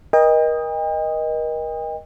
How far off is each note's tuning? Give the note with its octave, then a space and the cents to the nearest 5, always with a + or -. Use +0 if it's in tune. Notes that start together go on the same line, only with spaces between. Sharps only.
A#4 +35 D#5 +0 G5 +40